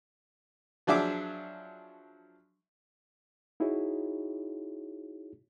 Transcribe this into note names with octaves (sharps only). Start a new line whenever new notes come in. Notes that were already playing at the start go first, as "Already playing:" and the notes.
F3 F#3 D4 G#4 E5 D6
D#4 E4 F#4 G#4 C#5